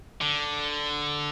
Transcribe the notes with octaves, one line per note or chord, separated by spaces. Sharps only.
D3